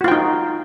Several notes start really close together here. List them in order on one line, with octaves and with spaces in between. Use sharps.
F#4 F4 G5 D#4